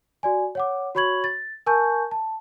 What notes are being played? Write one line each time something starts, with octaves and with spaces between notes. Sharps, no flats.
F#4 D5 G#5
C#5 F#5 D6
F#4 C#5 B5 C#6 G#6 F#7
A6
A#4 G#5 A5 C#6 G6
A5